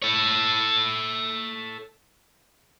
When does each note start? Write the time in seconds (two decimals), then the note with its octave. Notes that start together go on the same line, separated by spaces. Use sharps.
0.02 A4 C#5